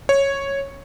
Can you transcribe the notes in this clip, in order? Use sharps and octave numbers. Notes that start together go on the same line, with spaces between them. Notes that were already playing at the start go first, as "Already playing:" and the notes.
C#5